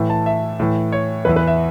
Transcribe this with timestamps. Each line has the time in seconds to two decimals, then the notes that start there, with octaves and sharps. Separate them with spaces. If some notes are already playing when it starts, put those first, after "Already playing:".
Already playing: A2 E3
0.10 A5
0.26 E5
0.59 A2 E3
0.92 C#5
1.25 E2 E3 B4
1.36 B4
1.47 E5